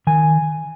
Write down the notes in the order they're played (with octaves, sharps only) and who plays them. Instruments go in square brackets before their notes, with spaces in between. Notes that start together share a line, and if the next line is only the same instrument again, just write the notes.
[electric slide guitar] D#3 G#5